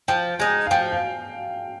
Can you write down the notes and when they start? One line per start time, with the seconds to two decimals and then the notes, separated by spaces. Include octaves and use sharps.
0.08 F3 G5
0.39 G#3 D#4 G#5
0.67 F5
0.71 F3 G5
0.92 F5